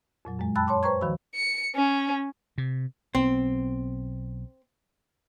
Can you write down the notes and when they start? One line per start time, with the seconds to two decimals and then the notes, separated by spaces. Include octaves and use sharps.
0.25 F2 A#2 F#3
0.39 F#2 G#3
0.55 G5 A5 B5 E6 F#6 A6
0.67 C#5 A5 C6 D6
0.83 B4 C5 G5 A#5 C#6 G#6
1.01 D#2 D#3 F3 F#4 B5 E6
1.35 C#7
1.75 C#4
2.58 C3
3.15 B1 B3 C4